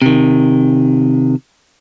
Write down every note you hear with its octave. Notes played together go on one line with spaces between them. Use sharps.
C3 D#3